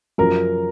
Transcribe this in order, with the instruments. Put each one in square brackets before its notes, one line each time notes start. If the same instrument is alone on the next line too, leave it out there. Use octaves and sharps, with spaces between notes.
[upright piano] F#2 C#3 F3 [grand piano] A#4 A#5